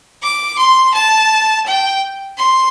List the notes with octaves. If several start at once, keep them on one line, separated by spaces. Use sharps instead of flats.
D6
C6
A5
G5
C6